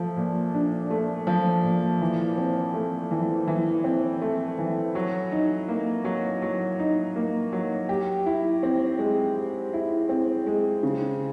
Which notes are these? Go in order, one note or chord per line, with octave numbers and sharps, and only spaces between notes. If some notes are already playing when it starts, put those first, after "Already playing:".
Already playing: F3 A3
A#2
D4
A3
F3
A#2
E3
C4
A3
E3
E3
C4
A3
E3
F#3
D#4
A#3
F#3
F#3
D#4
A#3
F#3
G4
E4
C4
G#3
G4
E4
C4
G#3
C#3